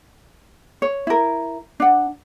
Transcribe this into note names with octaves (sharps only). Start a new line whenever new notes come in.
C#5
E4 A#4
D4 F#5